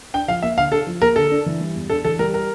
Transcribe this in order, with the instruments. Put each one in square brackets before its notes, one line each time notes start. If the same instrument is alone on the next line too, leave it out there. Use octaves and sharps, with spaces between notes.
[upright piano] D4 [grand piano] G5
[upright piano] F3 [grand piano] F5
[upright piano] A#3 [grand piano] E5
[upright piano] D3 [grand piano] F5
[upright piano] D4 [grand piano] A4
[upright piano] F3
[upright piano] A#3 [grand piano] A#4
[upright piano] D3 [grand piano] A4
[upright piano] D4
E3
G3
E2
[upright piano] D4 [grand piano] A4
[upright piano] E3 [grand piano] A4
[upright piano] G3 [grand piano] A#4
[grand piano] A#4